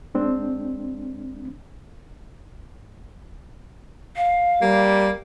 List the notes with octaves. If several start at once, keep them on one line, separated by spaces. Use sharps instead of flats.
G#3 C4 D4
F5
G3 A#3